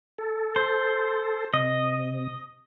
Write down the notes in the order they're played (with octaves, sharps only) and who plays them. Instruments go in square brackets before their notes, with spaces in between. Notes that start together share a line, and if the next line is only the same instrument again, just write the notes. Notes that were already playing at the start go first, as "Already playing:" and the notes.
[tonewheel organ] A4
[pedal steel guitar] C5
[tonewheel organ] C3 [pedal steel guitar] D#5